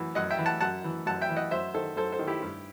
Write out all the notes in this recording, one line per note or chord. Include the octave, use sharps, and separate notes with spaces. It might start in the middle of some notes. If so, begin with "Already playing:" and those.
Already playing: F#2 E3
F#2 D#5 F#5
E5 G5
E3
F#5 A5
F#2 F#5 A5
E3
F#2 F#5 A5
E5 G5
E3
D#5 F#5
F#2 C5 E5
D#3 A4 C5
F#2 A4 C5
A4 C5
D#3
E4 G4
G2